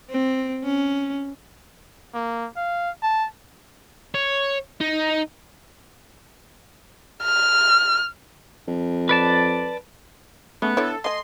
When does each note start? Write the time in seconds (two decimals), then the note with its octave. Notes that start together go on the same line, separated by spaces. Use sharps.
0.10 C4
0.64 C#4
2.14 A#3
2.56 F5
3.03 A5
4.14 C#5
4.80 D#4
7.23 F6
8.68 F2
9.09 B4 D5 A5
10.62 C#3 A3 B3
10.77 D3 E4 A4 C#5
11.04 A3 D#5 G#5 C6